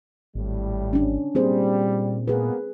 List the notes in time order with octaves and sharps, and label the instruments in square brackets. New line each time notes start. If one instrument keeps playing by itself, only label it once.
[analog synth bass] G#1 [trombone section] A2 G3
[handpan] C#4 D4
[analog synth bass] A#2 [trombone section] G3 [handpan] C4 G#4 C5
[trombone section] G#3 A#3 B3 [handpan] G#4 B4